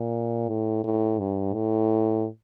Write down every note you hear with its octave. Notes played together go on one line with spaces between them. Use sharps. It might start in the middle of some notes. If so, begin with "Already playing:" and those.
Already playing: A#2
A2
A2
G2
A2